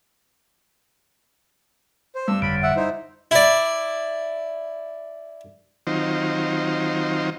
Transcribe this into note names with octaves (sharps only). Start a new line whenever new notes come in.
C5
G2 E6
F#1 F2 D3 B5
E5 F#5
D#4 E4 C5
E4 D5
D#3 F#3 C4 D#4 F4 C5